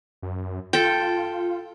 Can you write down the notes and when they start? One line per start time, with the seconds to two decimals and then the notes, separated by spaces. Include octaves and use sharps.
0.22 F#2
0.73 F4 A4 G5